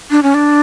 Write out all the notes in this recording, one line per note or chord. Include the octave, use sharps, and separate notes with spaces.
D4
C#4
D4